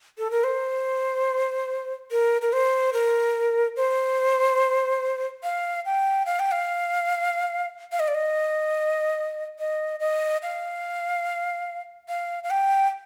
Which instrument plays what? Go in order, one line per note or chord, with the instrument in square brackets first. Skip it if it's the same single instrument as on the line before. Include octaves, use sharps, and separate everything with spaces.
[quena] A4
A#4
C5
A#4
A#4
C5
A#4
C5
F5
G5
F5
G5
F5
F5
D#5
D5
D#5
D#5
D#5
F5
F5
F5
G5